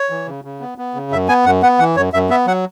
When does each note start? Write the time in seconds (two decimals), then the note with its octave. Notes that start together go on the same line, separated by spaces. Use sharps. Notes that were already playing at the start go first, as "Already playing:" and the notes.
Already playing: C#5
0.10 E3
0.27 C#3
0.45 C#3
0.61 B3
0.78 B3
0.95 C#3
1.11 F#2 E5
1.28 B3 G#5
1.46 F#2 F#5
1.63 B3 F#5
1.79 E3 F#5
1.96 F#2 C#5
2.13 F#2 E5
2.30 B3 E5
2.47 F#3 F#5